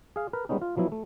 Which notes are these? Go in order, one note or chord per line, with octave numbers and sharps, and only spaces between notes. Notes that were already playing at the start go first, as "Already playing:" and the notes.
G#4 F5
A#4 B4
G3 G#3 B3 C#4 D#4
F4
F3 F#3 B3 E4
A3